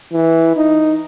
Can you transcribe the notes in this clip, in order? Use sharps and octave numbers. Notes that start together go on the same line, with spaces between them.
E3
D#4